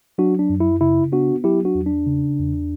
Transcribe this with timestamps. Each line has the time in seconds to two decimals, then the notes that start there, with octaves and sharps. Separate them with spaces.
0.18 F#3 D4 F#4
0.39 D4
0.50 F#2
0.60 E4
0.81 C#3 E4
1.12 B3 D4 F#4
1.44 F#3 E4 G4
1.65 D4 F#4
1.75 E2
1.86 D4
2.07 C#3
2.39 E2